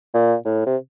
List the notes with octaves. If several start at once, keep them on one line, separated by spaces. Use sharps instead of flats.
A#2
A2
C3